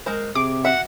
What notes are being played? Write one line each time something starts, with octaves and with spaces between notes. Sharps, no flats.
G#3 A#4 C5
C3 G#4 D6
F#4 E5 F#5